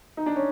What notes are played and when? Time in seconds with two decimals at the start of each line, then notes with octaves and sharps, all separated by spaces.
0.17 D#4
0.26 D4
0.36 C#4